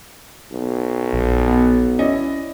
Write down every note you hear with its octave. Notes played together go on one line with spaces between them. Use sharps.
B1
A#1
B3
C#4 E4 D5 D#5